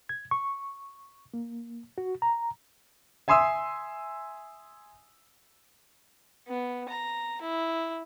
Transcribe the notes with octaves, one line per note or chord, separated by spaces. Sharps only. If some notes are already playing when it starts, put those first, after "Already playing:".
G#6
C#6
A#3
F#4
A#5
E5 G#5 C6 D#6 E6
B3
A#5
E4